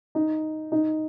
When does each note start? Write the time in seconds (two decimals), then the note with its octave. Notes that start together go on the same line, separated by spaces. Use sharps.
0.15 D#4
0.72 D#4